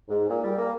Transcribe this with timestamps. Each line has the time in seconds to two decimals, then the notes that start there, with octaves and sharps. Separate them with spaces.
0.09 G#2
0.29 A#2
0.44 G3
0.57 A#3